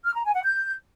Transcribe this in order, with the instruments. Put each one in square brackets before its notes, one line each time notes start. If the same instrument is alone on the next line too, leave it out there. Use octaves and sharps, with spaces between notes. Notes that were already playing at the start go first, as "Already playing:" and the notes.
[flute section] F6
A#5
G#5
F#5
G6